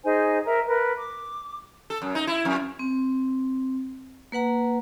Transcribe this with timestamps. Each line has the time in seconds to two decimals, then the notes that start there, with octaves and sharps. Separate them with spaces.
0.04 D#4 G#4 C5 G#5
0.46 A#4 E5 A#5
0.67 A#4 B4
0.96 D6
1.90 A4
2.02 F#2
2.15 D#4
2.27 E4
2.45 F2
2.79 C4
4.32 A#3 B4 F#5 A#5